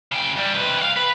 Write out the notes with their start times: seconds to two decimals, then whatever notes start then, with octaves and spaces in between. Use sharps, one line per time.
0.12 C#3 G5
0.37 G2 G3
0.55 C3 B4
0.79 F5 G5
0.97 B4